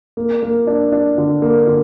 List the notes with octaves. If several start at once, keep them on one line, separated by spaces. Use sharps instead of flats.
A#3
A#3
D4
D4
D3
A#3
D3